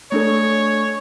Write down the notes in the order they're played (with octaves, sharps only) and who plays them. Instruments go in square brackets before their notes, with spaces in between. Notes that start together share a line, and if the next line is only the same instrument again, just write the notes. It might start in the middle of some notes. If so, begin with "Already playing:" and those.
[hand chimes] A3 D4 A4 [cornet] C#5